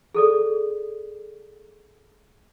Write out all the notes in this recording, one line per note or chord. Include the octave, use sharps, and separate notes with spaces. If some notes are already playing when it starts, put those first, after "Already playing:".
G#4 A4 D5